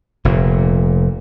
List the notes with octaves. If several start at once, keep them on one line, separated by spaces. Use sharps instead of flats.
F1 A#2